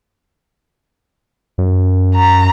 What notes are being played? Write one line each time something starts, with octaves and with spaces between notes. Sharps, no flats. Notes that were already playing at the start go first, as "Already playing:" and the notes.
F#2
A#5